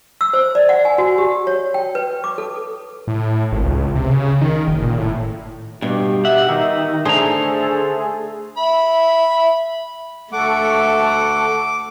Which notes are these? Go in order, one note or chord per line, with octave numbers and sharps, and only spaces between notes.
E6
C5
D5
F#5
G#5
F#4
G4
C#5
G5
B4
D6
A4
A2
G#1
C#2
C3
C#3
D#3
F#1
A#2
A2
G2 B2 G4
E5 F#5
D#3 D#4
D3 A3 G#4 A4 C5 A#5
E5 B5
D2 A3 A4 F#5 C#6 D6